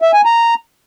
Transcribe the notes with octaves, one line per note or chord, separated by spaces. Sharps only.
E5
G#5
A#5